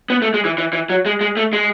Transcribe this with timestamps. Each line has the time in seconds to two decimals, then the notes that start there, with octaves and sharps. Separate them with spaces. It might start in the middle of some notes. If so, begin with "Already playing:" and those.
0.10 B3
0.22 A3
0.34 G#3
0.45 E3
0.58 E3
0.73 E3
0.90 F#3
1.06 G#3
1.21 G#3
1.37 A3
1.53 G#3